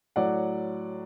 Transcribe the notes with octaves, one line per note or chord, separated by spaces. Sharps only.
A2 F#3 D5 F#5